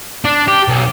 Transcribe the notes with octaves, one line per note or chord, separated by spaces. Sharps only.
D4
G4
B1